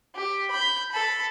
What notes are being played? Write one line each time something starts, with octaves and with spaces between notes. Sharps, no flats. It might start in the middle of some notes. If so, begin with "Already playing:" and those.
G4
B5 G6
A4 B5